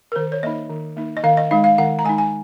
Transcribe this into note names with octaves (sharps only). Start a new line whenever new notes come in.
A#4
D#3 C5
C#5
A#3 D#4 D#5
D#3
A#3 D#4
D#5
D#3 F5
D#5
G#3 D#4 F5
F5
D#3 F#5
A#5
G#3 D#4 G#5
G#5